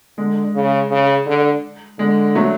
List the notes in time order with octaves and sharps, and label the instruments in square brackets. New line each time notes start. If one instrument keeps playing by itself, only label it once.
[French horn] D3 [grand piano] G#3
[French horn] C#3
C#3
D3
[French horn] D3 [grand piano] G#3
[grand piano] F#3 A3